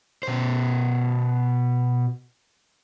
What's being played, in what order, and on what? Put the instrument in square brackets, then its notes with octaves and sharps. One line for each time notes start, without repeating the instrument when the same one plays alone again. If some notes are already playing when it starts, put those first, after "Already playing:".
[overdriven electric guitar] B2 C5